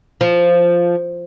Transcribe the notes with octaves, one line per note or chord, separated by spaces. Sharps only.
F3